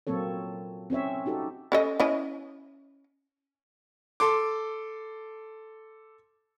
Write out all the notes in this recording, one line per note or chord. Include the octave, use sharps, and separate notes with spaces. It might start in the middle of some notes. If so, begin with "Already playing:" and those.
A#2 F#3 A#3 C4 A4 C#5
C4 C#4 C#5 E5
D#4 F#4 G4 A4
C#4 A4 D#5
C#4 E4 D#5
A4 C6 D6